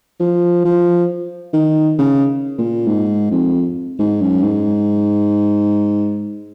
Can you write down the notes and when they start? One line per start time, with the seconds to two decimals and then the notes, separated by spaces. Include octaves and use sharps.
0.20 F3
0.64 F3
1.53 D#3
1.98 C#3
2.58 A#2
2.87 G#2
3.31 F2
3.99 G#2
4.21 F#2
4.43 G#2